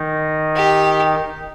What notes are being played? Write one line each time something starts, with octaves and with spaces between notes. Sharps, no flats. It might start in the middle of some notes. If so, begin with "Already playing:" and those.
Already playing: D#3 D#4
G4